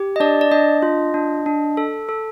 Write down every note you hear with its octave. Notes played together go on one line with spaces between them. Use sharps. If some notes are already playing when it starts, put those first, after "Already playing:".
Already playing: G4
D#5
D4 D5
D5
D4 D#5
F4
D4
D4
A4
A4